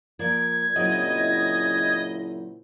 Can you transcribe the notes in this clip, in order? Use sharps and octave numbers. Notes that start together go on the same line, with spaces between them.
F3 A#3 D5 G#6
A#2 C#3 F#3 C4 E4 D#5